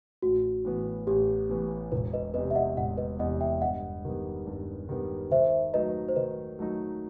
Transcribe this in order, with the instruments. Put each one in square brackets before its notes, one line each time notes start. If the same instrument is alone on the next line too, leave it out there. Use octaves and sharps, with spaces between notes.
[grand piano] A1 [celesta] F#4
[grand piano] A2 E3 B3
[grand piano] A1 [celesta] G4
[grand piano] A2 E3 B3
[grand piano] E1 [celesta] B4
[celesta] B4 D#5
[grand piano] E2 C3 [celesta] B4 D#5
[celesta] E5
D#5 F#5
[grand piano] E1 [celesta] D#5 F#5
[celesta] B4 D#5
[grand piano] E2 C3 [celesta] D#5 F#5
[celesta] E5 G5
[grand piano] G2 [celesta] D#5 F#5
[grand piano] D#3 G3 B3
G2
D#3 G3 B3
[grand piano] D#3 [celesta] C5 E5
[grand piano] F#3 A3 D#4 [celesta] B4 D#5
[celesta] C5
[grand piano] D#3 [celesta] B4 D#5
[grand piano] F#3 A3 D#4